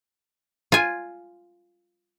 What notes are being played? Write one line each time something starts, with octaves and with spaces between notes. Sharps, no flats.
F4 G#5